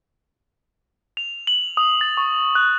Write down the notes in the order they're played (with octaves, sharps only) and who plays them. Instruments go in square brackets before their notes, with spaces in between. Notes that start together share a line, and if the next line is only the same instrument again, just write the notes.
[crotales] F7
F#7
D#6
A6
C#6
F#6